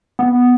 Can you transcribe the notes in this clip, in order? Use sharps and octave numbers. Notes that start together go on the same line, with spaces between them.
B3